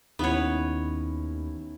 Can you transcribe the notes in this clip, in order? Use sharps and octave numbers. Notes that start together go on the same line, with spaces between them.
D#2 D#3 B3 C#4 E4 C#5